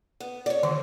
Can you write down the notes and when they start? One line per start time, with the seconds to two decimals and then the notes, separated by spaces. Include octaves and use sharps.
0.20 B3
0.46 C#5 D5
0.63 D2 D3 D#3